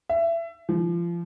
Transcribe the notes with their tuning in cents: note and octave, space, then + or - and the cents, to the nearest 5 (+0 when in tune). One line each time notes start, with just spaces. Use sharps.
E5 +25
F3 -30